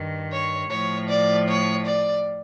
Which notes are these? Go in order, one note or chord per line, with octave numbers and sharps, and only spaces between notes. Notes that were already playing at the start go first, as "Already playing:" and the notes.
Already playing: G2 D#3
C#5
A2 F3 C#5
D5
C#5
D5